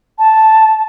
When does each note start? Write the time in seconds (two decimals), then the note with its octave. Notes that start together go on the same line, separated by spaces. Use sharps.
0.19 A5